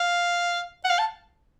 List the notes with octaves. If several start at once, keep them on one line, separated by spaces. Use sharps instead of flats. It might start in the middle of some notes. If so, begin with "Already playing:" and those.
Already playing: F5
F#5
F5
A5